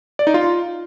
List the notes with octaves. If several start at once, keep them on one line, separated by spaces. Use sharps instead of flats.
D5
D#4
F4